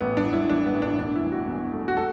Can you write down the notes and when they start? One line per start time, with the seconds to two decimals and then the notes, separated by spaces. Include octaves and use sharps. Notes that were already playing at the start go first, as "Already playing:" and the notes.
0.01 A1 B3
0.17 D4
0.24 E3
0.33 E4
0.49 E3 D4
0.66 B3
0.74 A1
0.82 D4
0.98 E1 D4
1.15 E4
1.23 E3
1.32 F#4
1.47 E2
1.72 A3
1.88 F#4
1.97 A4